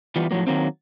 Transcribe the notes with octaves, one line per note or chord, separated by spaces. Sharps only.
E3 G3 B3 F4
A2 F3 F#3 A#3
D#3 F#3 A#3 C4